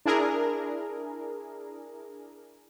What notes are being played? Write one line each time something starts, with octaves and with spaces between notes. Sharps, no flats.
D4 E4 G#4 A#4